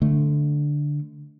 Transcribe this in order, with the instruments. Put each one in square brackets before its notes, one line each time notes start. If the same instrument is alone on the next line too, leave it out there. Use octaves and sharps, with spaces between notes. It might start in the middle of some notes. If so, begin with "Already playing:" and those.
[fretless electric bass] D3 A3